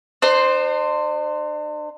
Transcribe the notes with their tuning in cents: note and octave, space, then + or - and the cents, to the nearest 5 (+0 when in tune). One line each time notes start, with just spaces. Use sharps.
D4 +45 C5 +0